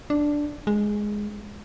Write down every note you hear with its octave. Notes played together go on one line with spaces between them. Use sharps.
D4
G#3